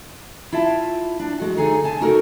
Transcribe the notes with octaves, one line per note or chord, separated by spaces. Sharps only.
E4 F4 E5 A5
D4
G#3 F#4
D3 D#4 G#4 A4 G#5
C#3 G#5 A5
D#4 F#4 A4 A#4 C#5